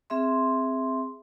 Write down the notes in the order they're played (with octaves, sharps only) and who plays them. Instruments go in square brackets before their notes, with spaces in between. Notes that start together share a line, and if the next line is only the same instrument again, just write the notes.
[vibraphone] C4 G#4 E5 C6